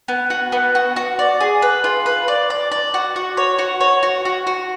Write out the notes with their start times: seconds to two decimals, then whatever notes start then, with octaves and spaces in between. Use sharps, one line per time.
0.08 B3
0.30 F#4
0.52 B3
0.75 F#4
0.96 F#4
1.19 D5
1.41 G#4
1.62 B4
1.84 F4
2.06 B4
2.28 D5
2.50 D5
2.72 D5
2.94 F#4
3.16 F#4
3.37 C#5
3.58 F#4
3.81 C#5
4.03 F#4
4.25 F#4
4.47 F#4